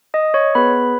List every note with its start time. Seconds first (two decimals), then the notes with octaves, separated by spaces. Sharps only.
0.14 D#5 D#6
0.34 C#5 C#6
0.55 B3 G#4 B4 B5